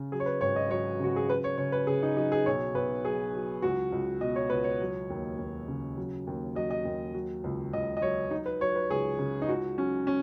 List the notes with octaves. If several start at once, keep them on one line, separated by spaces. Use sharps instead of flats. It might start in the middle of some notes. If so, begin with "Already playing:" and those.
Already playing: C#3
F#3 G#4
C#5
B4
G#1 C#5
D#5
F#3 C#5
C#3 F#4
G#4
F#3 B4
C#5
C#3 C#5
B4
C#3 G#4
D#4
F#3 D#4
G#4
B1 C#5
B1 B4
F#3 G#4
F#3
C#2 F#4
C#2
B2 D#5
C#5
C#2 B4
C#5
F#3
D#2
D#2
C#3
F#3
D#2
F#3 D#5
D#5
D#2
F#3
C#2
C#2 D#5
D#5
F#3 C#5
F#3 D#4
B4
F#3 C#5
B4
C#2 G#4
C#3
D#4
C#2 F#4
F#3 C#4
C#4